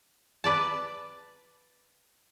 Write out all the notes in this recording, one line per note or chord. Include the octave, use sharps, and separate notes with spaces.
B4 D5 A5